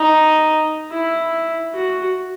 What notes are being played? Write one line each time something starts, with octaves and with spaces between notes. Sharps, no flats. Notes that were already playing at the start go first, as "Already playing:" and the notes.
Already playing: D#4
E4
F#4